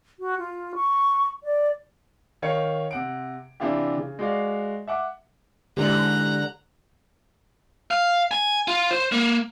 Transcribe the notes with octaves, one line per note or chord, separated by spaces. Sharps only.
F#4
F4
C#6
D5
D#3 C#5 F5 C#7
C3 F#5 D7
C3 E3 D4 E4 F4 G4
C#3
G#3 F#4 D5 F5
E5 F#5 D6
G#2 D3 E3 G4 D5 A#5 F#6
F5
G#5
F4
C5
A#3